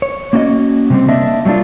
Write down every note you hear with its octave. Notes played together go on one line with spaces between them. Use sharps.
C#5
A#3 C#4 F#4 D5 D#5
C3 G3 C4
A#3 D4 D#5 E5
F#3 G3 A#3 D4 F4